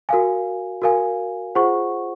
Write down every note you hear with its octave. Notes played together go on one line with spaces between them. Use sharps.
F#4 A#4 F5 G#5
F#4 A#4 F5 G#5
F4 G#4 C5 F#5 C#6